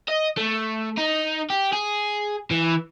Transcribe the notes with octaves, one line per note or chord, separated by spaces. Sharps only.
D#5
A3
D#4
G4
G#4
E3